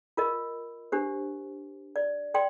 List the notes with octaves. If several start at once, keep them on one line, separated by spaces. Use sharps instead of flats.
F4 A#4 D#5
D4 G4 C5
D5
D5 G5 C6